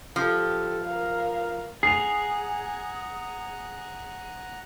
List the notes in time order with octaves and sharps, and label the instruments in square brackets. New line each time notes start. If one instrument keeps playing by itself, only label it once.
[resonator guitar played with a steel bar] F3 [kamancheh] G4 A4
[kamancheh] A#4 F5
[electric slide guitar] G#4 [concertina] F#5 A#5 [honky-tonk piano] C7 F7